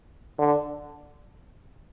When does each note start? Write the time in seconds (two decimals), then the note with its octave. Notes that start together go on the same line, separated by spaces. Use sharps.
0.39 D3